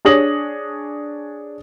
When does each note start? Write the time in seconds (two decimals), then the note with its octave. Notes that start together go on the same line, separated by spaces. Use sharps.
0.05 D4 G#4 C#5 D#6 A#6 F#7